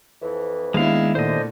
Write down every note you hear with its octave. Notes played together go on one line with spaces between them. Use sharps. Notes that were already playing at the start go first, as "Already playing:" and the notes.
F2 E3
D#2 G#3 B3 D4 E4 F5
A#2 D3 A3 C5 D#5